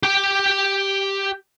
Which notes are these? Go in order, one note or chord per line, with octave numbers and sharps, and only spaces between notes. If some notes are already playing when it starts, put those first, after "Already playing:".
G4 G5